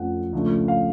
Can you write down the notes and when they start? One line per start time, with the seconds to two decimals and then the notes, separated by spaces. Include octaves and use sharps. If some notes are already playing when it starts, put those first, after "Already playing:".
Already playing: F2 F3 A3 C#4 F#5
0.33 C#2 C#3 F3 A3 D4
0.68 F5